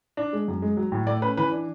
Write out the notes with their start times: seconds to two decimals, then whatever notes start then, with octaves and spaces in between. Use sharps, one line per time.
0.17 D4
0.33 G#3
0.48 F#2
0.62 G#3
0.77 F#3
0.92 A2
1.07 A3 D5
1.22 C#4 B4
1.37 E3 B4
1.52 D4